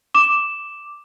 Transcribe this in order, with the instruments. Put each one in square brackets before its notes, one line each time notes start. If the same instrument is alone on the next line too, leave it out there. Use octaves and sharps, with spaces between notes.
[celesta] D6 E7